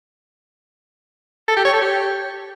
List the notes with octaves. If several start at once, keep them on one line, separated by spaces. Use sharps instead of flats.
A4
G4
C#5
A4
G4